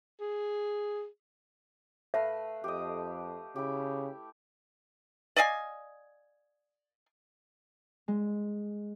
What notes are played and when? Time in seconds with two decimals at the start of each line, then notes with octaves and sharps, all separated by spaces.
0.20 G#4
2.14 A3 B4 E5 F5
2.64 F2 G4 D#5
3.56 C#3 E4 G4
5.36 D5 D#5 F5 G#5
8.08 G#3